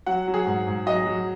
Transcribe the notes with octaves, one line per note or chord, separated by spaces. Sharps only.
F#3 F#5
F#3
G#4
G#2
G#2
F#3 D#5
F#3